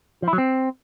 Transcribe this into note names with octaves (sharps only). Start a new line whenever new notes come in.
F3
E4
F#3
C4